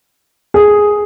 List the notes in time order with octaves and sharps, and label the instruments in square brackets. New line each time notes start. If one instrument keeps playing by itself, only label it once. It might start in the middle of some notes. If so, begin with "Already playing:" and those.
[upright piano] G#4